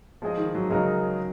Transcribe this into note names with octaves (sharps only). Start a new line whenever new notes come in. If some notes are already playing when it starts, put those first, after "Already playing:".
F3 G#3 D#4 G#4 D#5
D#3
F#3
C#3 F#3 G#3 D#4 A#4